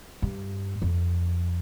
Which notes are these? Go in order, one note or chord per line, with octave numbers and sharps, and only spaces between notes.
G2
F2